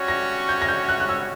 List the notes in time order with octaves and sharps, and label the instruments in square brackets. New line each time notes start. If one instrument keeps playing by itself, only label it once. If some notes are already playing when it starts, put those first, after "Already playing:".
Already playing: [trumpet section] G3 C#4 F#4 C#5
[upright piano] A#6
G6
A#6
G6
F#6
F#6
E6